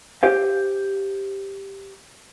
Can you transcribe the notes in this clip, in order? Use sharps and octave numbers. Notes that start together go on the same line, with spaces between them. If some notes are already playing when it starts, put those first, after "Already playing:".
G4 C5 F5